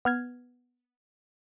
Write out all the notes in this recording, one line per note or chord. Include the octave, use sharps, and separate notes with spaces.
B3 F6 G#6